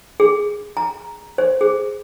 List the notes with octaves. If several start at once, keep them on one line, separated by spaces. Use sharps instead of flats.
G#4
A#5
C5
G#4